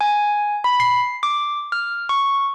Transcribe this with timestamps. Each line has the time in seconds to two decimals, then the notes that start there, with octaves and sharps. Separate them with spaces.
0.01 G#5
0.64 B5
0.80 C7
1.23 D6
1.72 F6
2.09 C#6